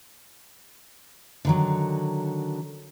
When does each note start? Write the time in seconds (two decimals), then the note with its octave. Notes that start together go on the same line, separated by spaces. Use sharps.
1.45 D3 D#3 F#3